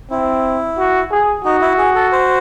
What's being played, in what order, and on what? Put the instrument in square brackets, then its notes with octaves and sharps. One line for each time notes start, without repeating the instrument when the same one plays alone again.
[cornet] C4 [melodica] E4
[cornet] F#4
G#4
[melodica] D#4 [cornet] F#4
[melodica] E4
G#4
A4
C5